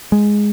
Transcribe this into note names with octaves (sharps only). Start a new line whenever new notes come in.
G#3